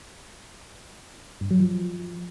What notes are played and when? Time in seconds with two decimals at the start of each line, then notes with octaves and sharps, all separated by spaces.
1.41 G2
1.51 F#3
1.60 F3